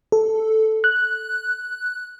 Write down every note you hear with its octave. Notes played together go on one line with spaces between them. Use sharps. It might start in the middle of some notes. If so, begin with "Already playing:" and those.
A4
F#6